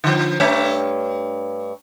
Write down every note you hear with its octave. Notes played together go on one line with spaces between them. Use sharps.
D3 F3
G2 A3 C#5